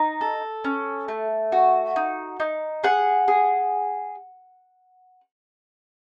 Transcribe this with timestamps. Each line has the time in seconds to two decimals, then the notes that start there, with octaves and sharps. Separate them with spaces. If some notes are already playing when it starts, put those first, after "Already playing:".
Already playing: D#4
0.21 A4
0.64 C#4
1.08 A3
1.52 F#4
1.96 D#4
2.40 D#4
2.84 G#4 F#5
3.28 G#4